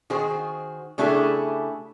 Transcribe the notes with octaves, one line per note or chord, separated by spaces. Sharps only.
D#3 F#4 G#4 C5
C#3 A3 D4 E4 G4 G#4